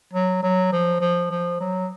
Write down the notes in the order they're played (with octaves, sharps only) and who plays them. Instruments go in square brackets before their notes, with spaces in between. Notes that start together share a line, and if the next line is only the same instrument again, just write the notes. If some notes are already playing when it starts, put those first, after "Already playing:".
[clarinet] F#3
F#3
F3
F3
F3
F#3